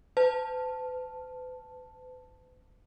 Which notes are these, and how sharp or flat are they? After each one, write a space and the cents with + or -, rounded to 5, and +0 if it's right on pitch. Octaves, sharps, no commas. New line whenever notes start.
B4 +45 A5 +5